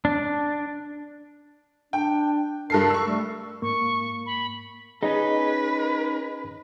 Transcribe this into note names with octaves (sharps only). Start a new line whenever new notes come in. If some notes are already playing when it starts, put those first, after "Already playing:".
D4
D4 G5
G2 C#3 D4 A4 A#4 C7
C#6 E6
G3 A3
G#2 A#3 C#6
B5
C#4 D#4 G#4 B4 D#5